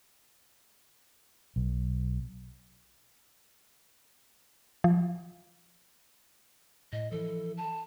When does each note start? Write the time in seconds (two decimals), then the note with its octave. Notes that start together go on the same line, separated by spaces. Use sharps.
1.56 B1
4.84 F3
6.92 A2 D#5
7.12 E3 F3 A4
7.57 A5